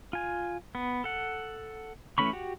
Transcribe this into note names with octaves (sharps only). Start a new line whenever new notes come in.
F4 G#5
B3
A4 F#5
E3 A3 C#4 B5 C#6
F#4 G4 F#5